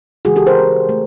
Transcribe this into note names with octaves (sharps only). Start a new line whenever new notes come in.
C#3 E3 G#3 F#4 G#4
G4 A4
A#4 C5
A3